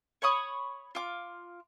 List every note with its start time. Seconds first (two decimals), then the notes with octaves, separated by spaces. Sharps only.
0.22 C#5 B5 C#6 D#6
0.95 F4 D6